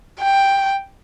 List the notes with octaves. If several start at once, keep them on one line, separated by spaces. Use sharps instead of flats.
G5